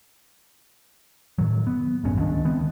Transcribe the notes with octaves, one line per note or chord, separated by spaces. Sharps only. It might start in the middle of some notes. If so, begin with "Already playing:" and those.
A2 D#3 F#3
B3
D#1 A1 G2 C#4
C#2 D#3 D4
D#3 G#3 B3 C4